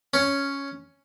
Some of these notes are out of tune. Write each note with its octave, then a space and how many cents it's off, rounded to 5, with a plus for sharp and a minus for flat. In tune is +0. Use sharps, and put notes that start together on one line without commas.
C#4 +5